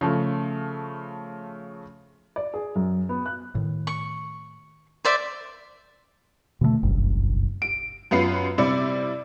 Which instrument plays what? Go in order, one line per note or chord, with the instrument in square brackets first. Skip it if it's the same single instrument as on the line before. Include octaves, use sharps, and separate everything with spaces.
[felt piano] C#3 F3 A3
[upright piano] D5
G#4
F#2
B3
F#6
[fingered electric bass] A2 D#3
[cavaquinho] C#6
C5 D5 E5
[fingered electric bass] B2 D3 F3 A3
F#1 B1 G2
[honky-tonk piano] D7
F#2 B3 F4 B4 C7
C3 G3 E4 D5 C#7